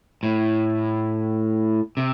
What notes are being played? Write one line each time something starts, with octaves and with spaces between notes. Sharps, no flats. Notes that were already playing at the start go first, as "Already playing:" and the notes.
A2
C3